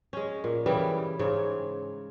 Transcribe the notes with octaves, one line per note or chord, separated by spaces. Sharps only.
G#3 C#4
A#2
C#3 E3 G3
G#2 C#3 C#5